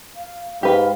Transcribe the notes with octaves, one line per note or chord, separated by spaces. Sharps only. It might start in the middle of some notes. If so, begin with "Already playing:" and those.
F5
G#2 G4 B4 F5